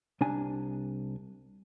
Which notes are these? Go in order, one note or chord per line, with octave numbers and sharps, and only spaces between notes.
C2 D4 G#5